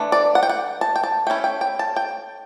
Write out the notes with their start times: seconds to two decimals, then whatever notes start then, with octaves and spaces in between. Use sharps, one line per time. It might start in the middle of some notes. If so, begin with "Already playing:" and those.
Already playing: E3 A3 D4
0.12 D5
0.35 F#5
0.43 G5
0.49 F#5
0.81 A5
0.96 G5
1.03 A5
1.27 A3 C#4 E4 G5
1.44 G5
1.61 G5
1.79 A5
1.96 G5